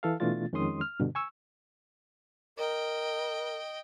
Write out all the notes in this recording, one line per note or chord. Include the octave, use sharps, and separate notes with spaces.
E3 A4 F5
B2 E3 A3 D4 F4 A6
F2 D#3 G#3 C#4 C6 D#6
F6
G2 B2 D3
G#5 C#6 E6
A#4 D#5 G5